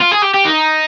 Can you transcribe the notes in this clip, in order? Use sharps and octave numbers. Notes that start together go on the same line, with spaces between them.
F4
G#4
G4
G4
D#4